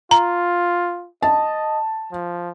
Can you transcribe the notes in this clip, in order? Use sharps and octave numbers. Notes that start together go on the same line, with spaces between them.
F4 A#5
D#5 A5
F3